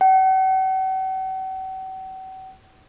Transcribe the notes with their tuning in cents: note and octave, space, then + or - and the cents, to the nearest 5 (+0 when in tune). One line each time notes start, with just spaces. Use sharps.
F#5 +45